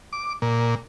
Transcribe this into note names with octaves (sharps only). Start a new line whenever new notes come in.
D6
A#2